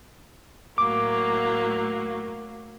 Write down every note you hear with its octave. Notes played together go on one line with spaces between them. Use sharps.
A2 F#3 A#3 D6